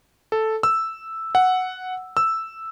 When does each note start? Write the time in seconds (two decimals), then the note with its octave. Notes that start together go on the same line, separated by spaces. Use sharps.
0.32 A4
0.63 E6
1.35 F#5
2.17 E6